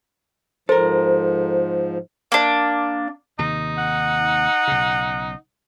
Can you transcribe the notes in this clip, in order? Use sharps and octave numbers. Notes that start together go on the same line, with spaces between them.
G#2 F3 A4 A#4 C5
A#3 D4
D#2 C3 D#3 D#4
F#5
B1 C#3